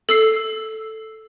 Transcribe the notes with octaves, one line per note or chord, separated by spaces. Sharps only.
A4 E6 C7